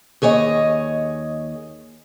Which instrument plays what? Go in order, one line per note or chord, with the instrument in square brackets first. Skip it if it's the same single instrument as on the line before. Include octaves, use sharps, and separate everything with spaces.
[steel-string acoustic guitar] D#2 G#4 C#5 D#5